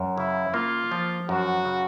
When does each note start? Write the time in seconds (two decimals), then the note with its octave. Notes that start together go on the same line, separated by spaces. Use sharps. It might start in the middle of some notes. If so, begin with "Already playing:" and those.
Already playing: F#2
0.17 C#3 E4
0.54 A#3 F4
0.92 F3
1.29 F#2 F#4
1.65 C#3